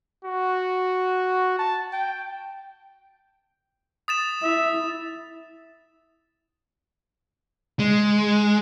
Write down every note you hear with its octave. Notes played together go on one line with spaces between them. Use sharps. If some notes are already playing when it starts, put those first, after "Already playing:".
F#4
A5
G5
D#6 A6 E7
E4 E5
G#3